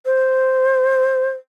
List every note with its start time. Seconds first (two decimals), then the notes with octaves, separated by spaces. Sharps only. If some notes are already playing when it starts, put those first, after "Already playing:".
0.06 C5